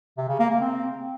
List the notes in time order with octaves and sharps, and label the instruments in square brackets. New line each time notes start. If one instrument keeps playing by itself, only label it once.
[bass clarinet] C3
C#3
A#3
A#3
C4